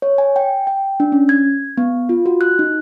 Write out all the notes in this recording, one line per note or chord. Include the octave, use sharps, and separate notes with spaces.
C#5
G#5
G5
G5
D4
C#4
G#6
B3
F4
F#4
F#6
D#4